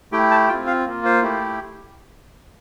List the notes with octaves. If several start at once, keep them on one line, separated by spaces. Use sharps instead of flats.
A3 E4 G4 G5
A5
C4 F4 G5
F5
A#3 F4
C5
A3 E4 G4